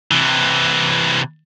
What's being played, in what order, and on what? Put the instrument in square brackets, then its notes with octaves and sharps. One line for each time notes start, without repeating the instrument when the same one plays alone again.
[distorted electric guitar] C3 E3